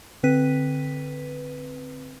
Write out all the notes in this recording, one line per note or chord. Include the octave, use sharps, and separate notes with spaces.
D3 C4 B4 B6 D#7